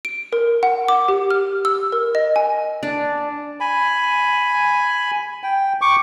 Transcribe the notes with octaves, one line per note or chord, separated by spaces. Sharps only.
D7
A#4
F#5
D6
G4
F6
E6
A#4
D#5
G#5
D4
G#5 B5
G5
C#6 D6